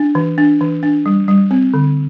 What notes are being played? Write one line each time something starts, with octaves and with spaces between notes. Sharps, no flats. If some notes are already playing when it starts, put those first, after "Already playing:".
Already playing: D4
E3
D4
E3
D4
G3
G3
C4
D3